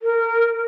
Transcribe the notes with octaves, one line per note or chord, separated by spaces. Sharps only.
A#4